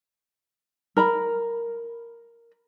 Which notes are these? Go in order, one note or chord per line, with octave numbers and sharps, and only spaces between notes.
A#4 A#5 B5